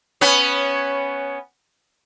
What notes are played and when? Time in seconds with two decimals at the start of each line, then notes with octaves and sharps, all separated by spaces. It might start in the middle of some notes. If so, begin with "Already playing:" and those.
0.21 B3 C#4 B4